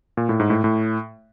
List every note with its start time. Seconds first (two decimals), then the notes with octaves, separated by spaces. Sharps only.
0.17 A#2
0.29 A2
0.40 G#2
0.50 A2
0.64 A2